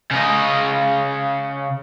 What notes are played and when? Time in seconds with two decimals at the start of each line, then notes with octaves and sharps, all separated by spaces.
0.11 C#3 D#5